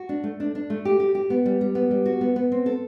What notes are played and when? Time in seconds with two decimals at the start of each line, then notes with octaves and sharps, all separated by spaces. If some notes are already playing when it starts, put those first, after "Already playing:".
Already playing: F#4
0.09 D4
0.24 A3
0.40 D4
0.55 D4
0.70 A3
0.85 G4
1.00 G4
1.15 G4
1.30 B3
1.46 G3
1.61 G3
1.75 B3
1.91 G3
2.06 F#4
2.21 B3
2.36 B3
2.52 C4
2.66 A4